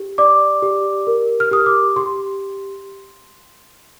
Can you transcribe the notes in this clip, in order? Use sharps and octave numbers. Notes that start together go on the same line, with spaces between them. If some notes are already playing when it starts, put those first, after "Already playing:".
Already playing: G4
D5 D6
G4
A#4
F6
G4 D#6
D6
G4 C6